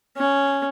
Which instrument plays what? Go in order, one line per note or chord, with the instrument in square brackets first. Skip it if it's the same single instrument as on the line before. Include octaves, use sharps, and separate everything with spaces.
[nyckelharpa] C#4